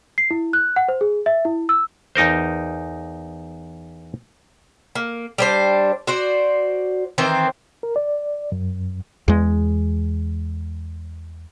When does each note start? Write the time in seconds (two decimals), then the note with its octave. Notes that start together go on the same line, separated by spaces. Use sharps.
0.18 C7
0.31 E4
0.53 F#6
0.76 F#5
0.89 C5
1.01 G#4
1.26 E5
1.45 E4
1.69 E6
2.15 E2 D#4 A#4 C5
4.95 A#3
5.38 G3 D4 C5
6.07 F#4 C5 D5
7.18 D#3 E3 C4 C5
7.83 A#4
7.96 D5
8.52 F#2
9.28 E2 G#3